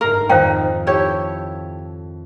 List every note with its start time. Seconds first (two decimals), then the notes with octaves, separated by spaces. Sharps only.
0.01 G1 G#2 A#4 F5
0.29 F2 D#3 D#4 C5 F5 G5
0.87 E4 G4 A4 C#5